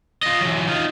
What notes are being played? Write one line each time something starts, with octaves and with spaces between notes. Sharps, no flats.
F4 D#5
E3 F#3
D#4 F4